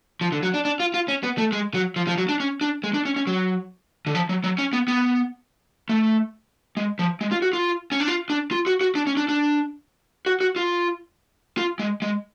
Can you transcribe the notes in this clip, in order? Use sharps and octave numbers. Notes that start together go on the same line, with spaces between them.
F3
D3
F#3
D4
D4
F4
F4
C#4
B3
A3
G#3
F#3
F3
F3
F#3
D4
C#4
D4
G#3
D4
C#4
C#4
F#3
D3
F3
F#3
F#3
C#4
B3
B3
A3
G#3
F3
G#3
F4
F#4
F4
C#4
D4
F4
D4
F4
F#4
F#4
D4
C#4
D4
D4
F#4
F#4
F4
F4
G#3
G#3